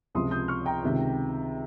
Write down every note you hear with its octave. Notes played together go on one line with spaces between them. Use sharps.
C#2 C3 F3 C6 D#6
D#6 G6
C#6 F6
G5 A#5
C#2 C3 D#3